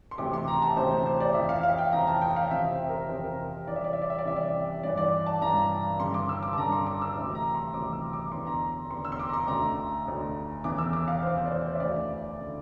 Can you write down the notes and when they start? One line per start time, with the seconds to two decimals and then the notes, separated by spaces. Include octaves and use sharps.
0.11 C6
0.18 D2 C3 E3 D6
0.33 C6
0.48 A#5
0.62 A5
0.76 D2 C3 E3 C5
1.06 C5
1.20 D5
1.34 F2 E3 E5
1.49 F5
1.63 F5
1.78 G5
1.92 F2 E3 A#5
2.07 A5
2.22 G5
2.36 F5
2.51 F2 C3 E3 E5
2.70 C5
2.89 A#4
3.09 F2 C3 E3 C5
3.24 A#4
3.67 C2 C3 E3 D5
3.76 E5
3.84 D5
3.93 E5
4.02 D5
4.10 E5
4.19 D5
4.25 C2 C3 E3 E5
4.36 D5
4.83 G2 E3 D5
4.97 D5
5.26 A5
5.42 G2 E3 A#5
6.00 G2 D3 C6
6.14 D6
6.29 E6
6.43 D6
6.53 A5
6.57 G2 D3 A#5
6.72 C6
6.86 D6
7.02 E6
7.16 D2 C3 E3 D6
7.35 A#5
7.55 C6
7.74 D2 C3 E3 D6
7.93 E6
8.13 D6
8.32 E2 D3 C6
8.47 A#5
8.90 E2 D3 C6
9.05 E6
9.12 C6
9.19 D6
9.29 A#5
9.33 C6
9.48 D2 D3 A#5
10.07 D2 D3
10.64 E2 E3 D6
10.78 E6
10.93 D6
11.08 F5
11.22 E2 E3 C5
11.38 C5
11.46 D5
11.51 C5
11.66 D5
11.75 E5
11.80 D2 D3 D5
12.40 D3